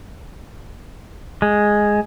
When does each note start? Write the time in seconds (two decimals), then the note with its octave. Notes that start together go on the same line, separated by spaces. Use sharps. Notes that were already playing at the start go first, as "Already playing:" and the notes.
1.42 G#3